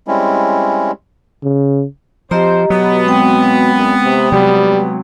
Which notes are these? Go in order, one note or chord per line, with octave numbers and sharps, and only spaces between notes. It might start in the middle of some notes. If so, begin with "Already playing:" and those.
G3 G#3 C4 C#4 E4
C#3
F3 C4 G4 C5 D#5 A#5
B2 F#3 B3
G#3 C4 G5
F#2
C3
C3 F#3 G3